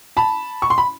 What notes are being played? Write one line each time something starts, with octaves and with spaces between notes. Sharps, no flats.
A5 B5
C#6
C6
B5